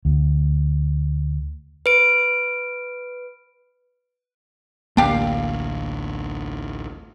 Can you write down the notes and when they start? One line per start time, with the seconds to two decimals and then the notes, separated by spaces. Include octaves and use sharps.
0.05 D2
1.86 B4 D7
4.97 A1 D2 A#3 D4 G4 F5